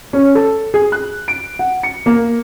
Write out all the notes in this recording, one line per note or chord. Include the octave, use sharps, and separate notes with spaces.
C#4
A4
G#4
F#6
D7
F#5
C#7
A#3